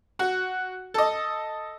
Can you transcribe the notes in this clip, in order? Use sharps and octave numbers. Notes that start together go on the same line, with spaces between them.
F#4
A4 D#5